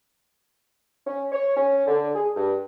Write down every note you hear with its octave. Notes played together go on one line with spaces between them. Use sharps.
C#4
C#5
C#4
D3
G#4
G2